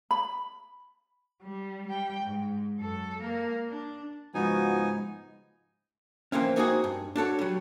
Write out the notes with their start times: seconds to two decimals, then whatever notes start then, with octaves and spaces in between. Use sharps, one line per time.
0.11 B5
1.42 G3
1.88 G3 G5
2.23 G#2
2.77 F#2 A4
3.22 A#3 A#4
3.69 D4
4.34 C#2 G#2 F3 B3 D#4 F#4 G#5
6.32 E3 F3 A#3 C4 C#4
6.56 A#3 C4 D#4 E4 F#4 G#4
6.84 G2
7.16 D4 F#4 A4 C#5
7.39 F#3 G3